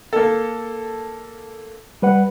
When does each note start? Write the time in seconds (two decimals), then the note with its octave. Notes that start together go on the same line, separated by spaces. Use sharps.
0.13 A#3 A4
2.02 G3 B4 F#5